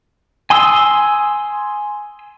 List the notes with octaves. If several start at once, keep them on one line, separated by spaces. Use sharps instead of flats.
G#5 C6 D#6 E6